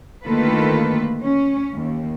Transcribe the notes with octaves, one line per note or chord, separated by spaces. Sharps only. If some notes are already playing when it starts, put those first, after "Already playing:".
D2 D#3 A#3 F4 A4 B4
C#4
D#2